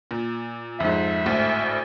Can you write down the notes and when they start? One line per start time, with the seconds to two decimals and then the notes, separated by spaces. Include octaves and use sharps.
0.11 A#2
0.80 F2 G#2 E5
1.25 G#1 D2 A2